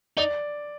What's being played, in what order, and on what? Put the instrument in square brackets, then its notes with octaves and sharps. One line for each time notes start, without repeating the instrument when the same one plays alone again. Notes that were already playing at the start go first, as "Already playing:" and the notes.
[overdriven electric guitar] D#4 [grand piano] D5